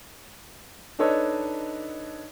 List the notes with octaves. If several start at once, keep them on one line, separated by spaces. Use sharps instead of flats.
D4 D#4 A4 B4 C#5 D#5